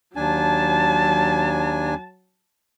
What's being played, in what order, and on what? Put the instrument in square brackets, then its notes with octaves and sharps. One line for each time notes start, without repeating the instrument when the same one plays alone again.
[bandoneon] D#2 D4 G#5 [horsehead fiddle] F#3 A5